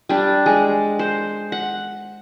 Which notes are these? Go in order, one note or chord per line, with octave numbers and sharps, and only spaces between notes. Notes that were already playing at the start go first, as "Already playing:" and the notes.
G3 D4
G#3
C5
F#5